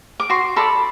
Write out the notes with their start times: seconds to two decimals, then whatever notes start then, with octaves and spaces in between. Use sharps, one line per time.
0.20 D6
0.30 F#4 C6
0.56 A4 D5 B5